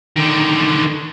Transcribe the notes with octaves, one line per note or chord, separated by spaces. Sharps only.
D3 D#3